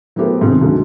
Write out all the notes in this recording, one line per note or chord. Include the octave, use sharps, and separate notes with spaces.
F#3 A3 B3 G4 A#4 C5
G#2 C3 D#3 B3 C4
D2 G#2 D3 F#3